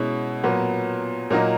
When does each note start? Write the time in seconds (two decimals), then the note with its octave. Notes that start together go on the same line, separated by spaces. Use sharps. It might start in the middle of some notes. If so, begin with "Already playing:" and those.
Already playing: B2 G#3 C#4 E4
0.43 A#2 F#3 B3
1.30 A#2 F#3 A#3 D#4